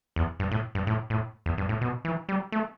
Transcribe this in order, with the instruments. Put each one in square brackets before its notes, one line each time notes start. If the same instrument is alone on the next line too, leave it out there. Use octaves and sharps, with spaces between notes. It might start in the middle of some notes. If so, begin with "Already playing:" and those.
[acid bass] E2
G2
A2
G2
A2
A2
E2
G2
A2
B2
E3
G3
A3